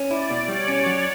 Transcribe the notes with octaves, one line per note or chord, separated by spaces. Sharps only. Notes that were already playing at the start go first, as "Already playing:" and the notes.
Already playing: C#4
E4 D5
B2
G3 C#5
C#4
F#3